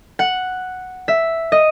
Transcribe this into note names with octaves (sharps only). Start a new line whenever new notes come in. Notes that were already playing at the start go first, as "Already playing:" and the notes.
F#5
E5
D#5